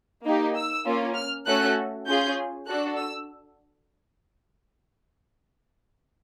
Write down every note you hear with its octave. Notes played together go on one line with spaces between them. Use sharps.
A#3 D#4 G4
E6
A#3 C#4 F4
F6
A3 C#4 F#4 A4 F#6
C#4 F4 G#4 G6
D4 F#4 A4 F#6
E6